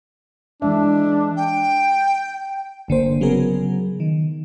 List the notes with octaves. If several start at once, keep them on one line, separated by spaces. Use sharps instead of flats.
E3 G#3 D4 E5
G5
G1 D3 A#3 C5
C#3 F#3 B3 G#4 A#4
D#3